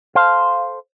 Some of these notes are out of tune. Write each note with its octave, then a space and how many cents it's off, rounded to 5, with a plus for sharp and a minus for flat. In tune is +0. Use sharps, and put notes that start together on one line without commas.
A4 -15 C5 +0 F5 +0